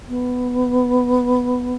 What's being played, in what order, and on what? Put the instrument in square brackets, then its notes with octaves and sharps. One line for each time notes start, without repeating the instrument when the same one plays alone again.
[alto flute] B3